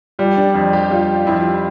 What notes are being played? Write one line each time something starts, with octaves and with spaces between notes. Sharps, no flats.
F3 G3
D4
F2
G4
G3 F4
F2 E4